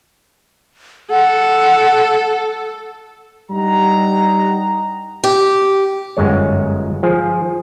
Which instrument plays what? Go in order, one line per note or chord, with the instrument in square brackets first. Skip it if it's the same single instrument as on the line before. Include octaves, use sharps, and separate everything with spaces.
[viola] A4 [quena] F#5
[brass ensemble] G2 G3 D#4 G4 F#5 A#5
[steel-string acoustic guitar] G4
[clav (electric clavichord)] G1 F#2 G#3 C#5
F3 G#4